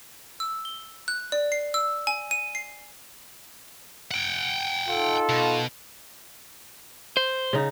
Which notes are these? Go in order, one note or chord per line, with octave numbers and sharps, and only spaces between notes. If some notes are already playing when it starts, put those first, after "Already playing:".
E6
G7
F#6
D5
C7
E6
G#5
D#7
C7
F#5 G5
D#4 F4 A4
B2
C5
C#3 D#4